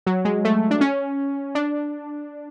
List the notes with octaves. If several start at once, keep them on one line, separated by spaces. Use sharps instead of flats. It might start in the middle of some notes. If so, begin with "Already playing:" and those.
F#3
G#3
A3
D4
C#4
D4